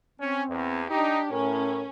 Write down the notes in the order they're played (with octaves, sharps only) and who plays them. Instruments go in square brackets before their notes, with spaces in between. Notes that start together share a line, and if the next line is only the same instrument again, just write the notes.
[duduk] C4 [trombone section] C#4
[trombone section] E2
[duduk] D4 [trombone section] D#4 [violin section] G4
[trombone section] A2 [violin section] C#4 [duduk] A#4